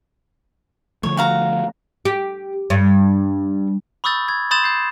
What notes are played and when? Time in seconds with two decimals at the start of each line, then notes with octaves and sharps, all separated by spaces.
1.03 D3 F3 A3 C#5
1.17 F#4 F5 A#5
2.05 G4
2.70 G2
4.04 B5 C#6 D#6 E6 G6 A6
4.28 G#6
4.51 B5 C6 D#6 G6 A6 E7
4.64 G6 C7